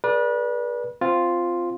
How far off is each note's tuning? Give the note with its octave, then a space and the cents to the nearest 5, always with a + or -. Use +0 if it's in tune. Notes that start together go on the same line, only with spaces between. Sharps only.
G#4 +30 B4 -35 D5 +0
C4 +0 F4 +0